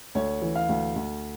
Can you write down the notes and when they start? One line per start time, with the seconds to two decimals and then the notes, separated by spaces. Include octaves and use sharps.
0.15 D2 C#5
0.42 E3
0.55 F5
0.69 D2
0.96 D2